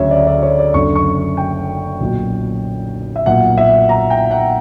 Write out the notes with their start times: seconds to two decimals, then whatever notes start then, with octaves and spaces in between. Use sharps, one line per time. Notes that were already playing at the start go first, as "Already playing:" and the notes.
Already playing: D2 C#3 F#3 C#5 E5
0.11 D5
0.27 D5
0.42 C#5
0.58 D5
0.74 F#1 F#2 D3 C#6
0.95 C#6
1.37 G5
2.00 B1 A#2 F#3
3.16 E5
3.26 B1 A#2 F#3 F#5
3.58 E5
3.89 A#5
4.10 G5
4.31 F#5